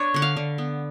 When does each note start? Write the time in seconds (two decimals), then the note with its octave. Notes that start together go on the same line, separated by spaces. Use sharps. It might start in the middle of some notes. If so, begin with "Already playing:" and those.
Already playing: D4 B4 C#5
0.14 D3 F#5
0.22 F5
0.37 D3
0.58 B3